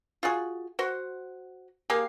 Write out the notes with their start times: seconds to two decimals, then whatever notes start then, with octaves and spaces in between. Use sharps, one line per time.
0.23 F4 F#4 G#4
0.79 F#4 C5 F#5
1.90 A#3 G4 G#4 F5